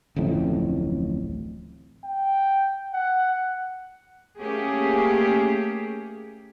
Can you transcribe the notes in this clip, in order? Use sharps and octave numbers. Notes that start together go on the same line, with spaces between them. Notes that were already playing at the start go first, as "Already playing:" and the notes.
D1 A1 F2 A2
G5
F#5
A3 A#3 C#4 G4 G#4